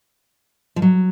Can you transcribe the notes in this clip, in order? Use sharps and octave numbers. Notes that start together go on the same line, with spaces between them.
F3
F#3